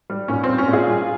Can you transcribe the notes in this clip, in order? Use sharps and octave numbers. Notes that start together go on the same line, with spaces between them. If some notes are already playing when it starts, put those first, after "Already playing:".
G3
A#2 C#4
G3 C4
C#4
A#2
F4 G#4
G3